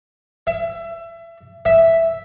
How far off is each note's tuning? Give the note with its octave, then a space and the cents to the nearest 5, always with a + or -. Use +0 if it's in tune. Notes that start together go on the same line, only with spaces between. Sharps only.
E5 +25
E5 +0